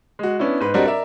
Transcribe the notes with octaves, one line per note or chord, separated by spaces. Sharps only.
G#3 F#4
B3 C#4 D4 E4
G#2 B4
G3 C4 D4 F#4 A#4 D#5
A#4 D5 E5